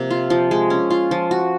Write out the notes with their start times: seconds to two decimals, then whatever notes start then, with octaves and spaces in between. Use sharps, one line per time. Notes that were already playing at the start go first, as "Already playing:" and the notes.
Already playing: C3 F3 A#3
0.11 F4
0.30 F3
0.51 G#3
0.70 C#4
0.90 F4
1.11 F3
1.31 F#4